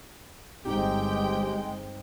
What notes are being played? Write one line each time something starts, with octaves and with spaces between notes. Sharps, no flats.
G1 G#3 C4 D#4 G4 G5